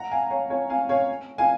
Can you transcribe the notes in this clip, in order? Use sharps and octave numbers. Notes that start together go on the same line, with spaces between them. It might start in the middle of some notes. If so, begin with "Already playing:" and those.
Already playing: F#5 A#5
F5 G#5
C#5 F5
C#5 F5
F5 G#5
C#5 F5
F5 G#5